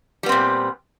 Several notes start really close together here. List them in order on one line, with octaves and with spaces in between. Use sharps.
G3 B3 C4 A#2